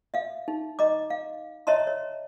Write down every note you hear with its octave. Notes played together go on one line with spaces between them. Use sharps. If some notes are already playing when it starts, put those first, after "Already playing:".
E5 F5
D#4
D#5 A#5 D6
F5
C#5 D#5 E5 A5 A#5 C6
C#5